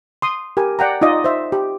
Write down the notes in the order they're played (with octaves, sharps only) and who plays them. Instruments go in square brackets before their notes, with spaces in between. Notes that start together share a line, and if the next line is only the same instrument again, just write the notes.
[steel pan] C6 D#6
G4 A#4 G#5
D5 F#5 G5 A#5
D#4 F4 D5 D#5
C5 E5
G4